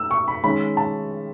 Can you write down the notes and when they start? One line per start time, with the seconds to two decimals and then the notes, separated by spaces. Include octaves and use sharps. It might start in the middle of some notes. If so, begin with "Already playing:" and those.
Already playing: A3 E6
0.11 C#6
0.28 B5
0.44 D#3 G#3 C#4 B5
0.77 A5